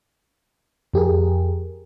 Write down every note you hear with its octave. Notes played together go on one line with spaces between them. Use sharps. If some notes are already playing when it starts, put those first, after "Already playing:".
F2 G4 G#4 A#4